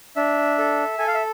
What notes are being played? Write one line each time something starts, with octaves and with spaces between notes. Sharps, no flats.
D4 E5
A4
A4 G#5
F5
E5